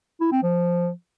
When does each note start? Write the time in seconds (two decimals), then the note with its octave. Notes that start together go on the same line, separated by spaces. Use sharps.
0.21 E4
0.32 C4
0.43 F3